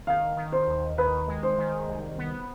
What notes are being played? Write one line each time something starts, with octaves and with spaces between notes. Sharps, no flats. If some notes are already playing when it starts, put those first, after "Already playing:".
D#3 F5
D#3
C5
D#2
D#3 B4
G#3
C5
D#3
C2
B3